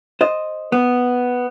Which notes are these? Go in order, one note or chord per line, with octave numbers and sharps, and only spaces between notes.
C5 D#5
B3